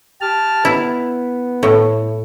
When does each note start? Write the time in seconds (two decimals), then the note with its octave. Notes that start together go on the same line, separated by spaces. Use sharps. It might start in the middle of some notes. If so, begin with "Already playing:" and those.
0.21 G4 A5 F6
0.65 B3 E4
1.63 A2